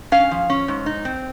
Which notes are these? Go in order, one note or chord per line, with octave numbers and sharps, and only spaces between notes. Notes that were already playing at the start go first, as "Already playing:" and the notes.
C#4 F5
F3
C#4
G#2
D#4
C4